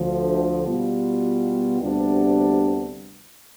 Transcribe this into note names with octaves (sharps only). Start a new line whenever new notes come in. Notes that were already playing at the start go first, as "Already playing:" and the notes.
Already playing: D2 D3 F3
B2 G3 B3 F4
D2 C3 G3 B3 D4